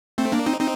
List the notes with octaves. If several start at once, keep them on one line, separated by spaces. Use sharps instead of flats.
A3 C4
A#3 D4
C4 D#4
C4 D#4